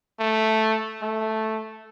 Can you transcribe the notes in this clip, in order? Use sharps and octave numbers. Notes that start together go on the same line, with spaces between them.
A3
A3